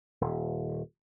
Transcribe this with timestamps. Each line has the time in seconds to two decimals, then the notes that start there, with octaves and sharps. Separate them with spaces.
0.21 D#1